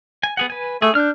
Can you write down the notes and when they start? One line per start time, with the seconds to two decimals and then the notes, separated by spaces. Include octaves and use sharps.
0.23 G#5
0.37 B3 G#4 F#5
0.50 B4 G#5
0.82 A3 G#4
0.95 D4 F6 G6